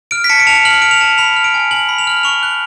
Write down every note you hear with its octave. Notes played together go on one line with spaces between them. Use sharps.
F6 D7
B6
A5 C#7
D7
A5 F7
F6 F#7
F6 D7
F7
A5
B5 F7
F6
D7
G#5
G#5 F#7
B5
F7
F6 F#7
C#6 F7
F#6